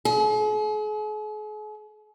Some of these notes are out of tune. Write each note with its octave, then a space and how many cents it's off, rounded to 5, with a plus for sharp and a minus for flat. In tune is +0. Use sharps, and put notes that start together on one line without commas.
G#4 +45